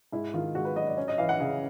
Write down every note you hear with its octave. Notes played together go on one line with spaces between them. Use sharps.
G#2 E4
D#3 F4
G#2 F#4
B4
F#3 D#5
D5
C#4
D#5
E3 F5
F#5
C#3